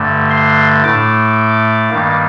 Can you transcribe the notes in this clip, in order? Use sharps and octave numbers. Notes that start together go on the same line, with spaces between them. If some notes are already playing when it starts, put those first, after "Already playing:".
Already playing: G2 D3 A3
C6
A2 A3 D6
G2 D#3 G3 A#3